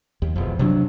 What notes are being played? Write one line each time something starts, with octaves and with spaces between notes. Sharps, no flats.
D#2
E1 F2
C3 F#3 C#4 D4